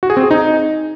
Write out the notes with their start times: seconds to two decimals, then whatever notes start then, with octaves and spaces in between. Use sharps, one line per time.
0.03 F#4
0.10 G#4
0.17 C4
0.24 G#4
0.31 D#4